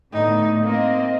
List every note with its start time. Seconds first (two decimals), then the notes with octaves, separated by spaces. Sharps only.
0.13 A2 D3 B3 D#4
0.63 A#3 C4 D#5